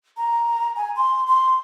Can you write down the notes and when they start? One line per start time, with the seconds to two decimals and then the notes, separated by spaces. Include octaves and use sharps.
0.17 A#5
0.76 G#5
0.96 C6
1.27 C6